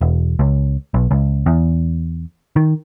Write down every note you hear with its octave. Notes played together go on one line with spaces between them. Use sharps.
E1
C#2
B1
C#2
E2
D#3